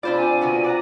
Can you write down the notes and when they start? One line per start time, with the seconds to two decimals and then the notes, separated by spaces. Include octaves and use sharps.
0.03 C3 D4 F4 C5 D5 B5
0.16 G#5
0.41 B2 D3 B3
0.64 D5 F#5 A#5